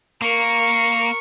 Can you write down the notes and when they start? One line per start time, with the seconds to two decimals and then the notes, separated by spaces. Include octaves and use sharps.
0.22 A#3 A#4 C#6